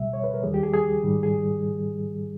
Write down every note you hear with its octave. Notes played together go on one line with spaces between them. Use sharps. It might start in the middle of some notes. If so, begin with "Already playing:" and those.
Already playing: C#2 B2 G3 E5
C#5
B4
A#4
D#2 D#3 G3 G#4
G4
G#4
G#4
G#2 D#3 G3
G#4